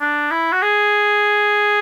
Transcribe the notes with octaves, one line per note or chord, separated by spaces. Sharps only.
D4
E4
F#4
G#4